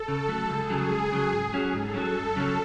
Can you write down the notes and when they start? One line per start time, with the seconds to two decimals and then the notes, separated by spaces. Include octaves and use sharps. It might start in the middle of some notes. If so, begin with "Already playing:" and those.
Already playing: A4
0.08 C#3
0.29 F#3 A3
0.49 C#2 G#4
0.70 C#3 F#3
0.91 C#2
1.12 C#3 F#3
1.32 G#2
1.53 F#3 C#4 F#4
1.73 G#2 A4
1.94 F#3 C#4 F#4
2.15 F#2
2.36 C#3 F#3 C#4